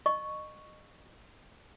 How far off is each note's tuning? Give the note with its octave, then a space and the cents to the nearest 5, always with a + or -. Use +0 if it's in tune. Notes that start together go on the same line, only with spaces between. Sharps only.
D#5 -25 C#6 +0